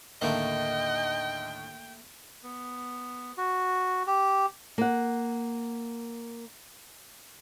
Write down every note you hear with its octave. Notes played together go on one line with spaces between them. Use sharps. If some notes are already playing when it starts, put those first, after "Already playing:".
D#2 A2 D3 A3 A#3 D#5 G5
B3
F#4
G4
A#3 F#5